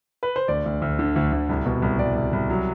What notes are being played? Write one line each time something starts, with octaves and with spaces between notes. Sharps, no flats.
B4
C5
D2 D5
D2
D2
D3
D2
D2
C2
B2
C2
C2 D5
C2
C2
F#3